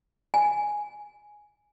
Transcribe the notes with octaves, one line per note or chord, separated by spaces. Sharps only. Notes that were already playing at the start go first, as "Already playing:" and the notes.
G#5